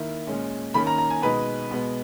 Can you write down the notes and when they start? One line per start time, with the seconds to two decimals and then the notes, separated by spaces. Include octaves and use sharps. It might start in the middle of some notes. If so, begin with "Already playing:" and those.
Already playing: D#3 A#3 E4
0.27 A#2 G#3 C#4
0.74 D#3 A#3 C#4 B5
0.87 A#5
0.98 A#5
1.10 G#5
1.22 B2 G#3 D#4 B4
1.71 B2 G#3 B3